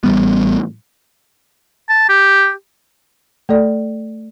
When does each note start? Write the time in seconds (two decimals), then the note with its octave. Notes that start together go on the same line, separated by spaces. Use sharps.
0.04 A1 G3 B3
1.89 A5
2.09 G4
3.49 A3 A4 D5